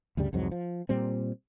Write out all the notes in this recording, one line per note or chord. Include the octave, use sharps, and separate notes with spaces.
D2 G2 C#3 G3
C2 F2 G#2 F#3
F3
A#2 G3 C4